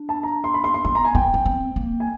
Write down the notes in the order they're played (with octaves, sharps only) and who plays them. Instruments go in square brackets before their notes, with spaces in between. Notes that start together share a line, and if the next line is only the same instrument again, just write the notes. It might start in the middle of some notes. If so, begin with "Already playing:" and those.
Already playing: [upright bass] D4
[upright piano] A5
A#5
C6
B5
C6
C6
[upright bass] B3 [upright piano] C6
[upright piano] A#5
G#5
[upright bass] B3 [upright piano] G5
[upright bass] C#4
C4
A#3
[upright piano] G#5